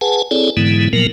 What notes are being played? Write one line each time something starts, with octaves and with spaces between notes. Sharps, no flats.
G#4 B4 F#5 G#5 A5
C4 E4 G#4 A4 C#5 D5
G#2 D3 E3 G#3 B3 E4
A#2 F3 F#3 A#3 B3 A#4